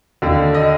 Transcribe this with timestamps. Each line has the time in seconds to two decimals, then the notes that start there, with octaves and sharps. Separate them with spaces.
0.22 D#2 D3
0.54 D#5